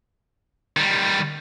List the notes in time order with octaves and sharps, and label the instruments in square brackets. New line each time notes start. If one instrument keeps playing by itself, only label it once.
[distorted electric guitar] D#3 G3